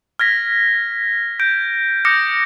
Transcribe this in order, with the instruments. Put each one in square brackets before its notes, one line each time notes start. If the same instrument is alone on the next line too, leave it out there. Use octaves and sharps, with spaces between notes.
[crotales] F6 G#6 A#6 B6
G6 A#6 D7
D6 D#6 F6 G6 A#6 C#7